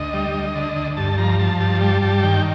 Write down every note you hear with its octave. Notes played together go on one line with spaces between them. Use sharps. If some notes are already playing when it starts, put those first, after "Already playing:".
Already playing: D2 D#5
G3
D2
D3
D2
G2 A5
F3 A#5
F3 A5
G2 A5
G3 A5
G2 A5
D#3 G5